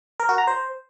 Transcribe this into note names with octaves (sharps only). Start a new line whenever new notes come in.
A#4
F#4
A#5
C5